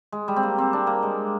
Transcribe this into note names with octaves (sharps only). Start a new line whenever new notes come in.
G#3
G3
C4
A#3
C4
D4
A#3
G#3